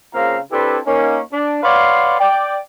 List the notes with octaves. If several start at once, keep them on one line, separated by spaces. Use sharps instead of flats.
C#3 A#3 C4 F4 F5 A#5
C4 D4 E4 G4 A4 B4
A#3 C#4 D#4
D4
B4 C#5 D5 F5 F#5 C6
D5 G5